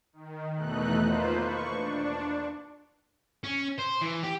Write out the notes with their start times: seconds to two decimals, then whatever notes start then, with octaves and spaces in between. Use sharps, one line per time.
0.13 D#3
0.55 E2 B2 A3 D#4 F#6
1.03 A#3 F4 B4 C5
1.40 C#6
1.69 D4
3.44 C#4
3.79 C5
4.02 E3
4.24 G4